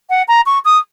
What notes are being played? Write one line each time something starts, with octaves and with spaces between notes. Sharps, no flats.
F#5
A#5
C#6
D#6